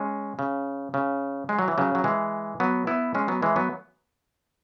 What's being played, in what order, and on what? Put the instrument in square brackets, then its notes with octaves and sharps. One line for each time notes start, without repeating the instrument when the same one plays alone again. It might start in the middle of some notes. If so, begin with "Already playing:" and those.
Already playing: [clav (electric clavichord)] G#3 C#4
C#3
C#3
G#3
F#3
E3
C#3 F#3
F#3
E3 G#3
F#3 B3
B3 E4
G#3 C#4
F#3 B3
E3 G#3
F#3 B3